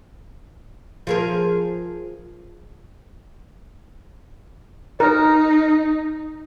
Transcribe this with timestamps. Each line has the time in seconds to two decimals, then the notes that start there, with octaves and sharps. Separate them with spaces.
1.07 F3 G#4 A#4
5.00 D#4 A#4